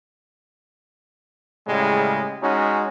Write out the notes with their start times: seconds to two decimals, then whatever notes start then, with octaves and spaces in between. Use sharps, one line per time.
1.67 A2 C#3 G3 G#3
2.42 G#3 C#4 D#4 F#4